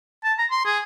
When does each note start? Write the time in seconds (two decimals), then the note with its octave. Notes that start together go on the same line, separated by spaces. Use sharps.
0.24 A5
0.39 A#5
0.51 C6
0.65 G#4